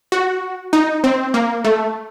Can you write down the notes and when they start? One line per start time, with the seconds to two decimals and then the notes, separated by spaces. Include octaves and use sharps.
0.12 F#4
0.73 D#4
1.04 C4
1.34 A#3
1.65 A3